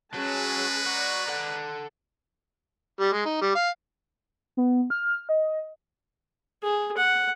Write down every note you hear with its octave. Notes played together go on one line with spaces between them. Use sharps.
F#3 G#3 C#4 G#4 B4 A5
F#4 D5 A#5
A4 F#5
G3
G#3
D#4
G3
F5
B3
F6
D#5
G#4
F#5